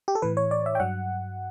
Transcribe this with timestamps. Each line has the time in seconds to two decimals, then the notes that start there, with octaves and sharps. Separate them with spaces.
0.08 G4
0.15 A4
0.22 A2 E3 B4
0.37 C#5
0.51 D5
0.66 E5
0.75 G5
0.80 G2 F#3 F#5